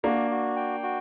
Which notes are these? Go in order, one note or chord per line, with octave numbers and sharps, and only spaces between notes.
A#3 D4 F#4
F#4
G5
F#4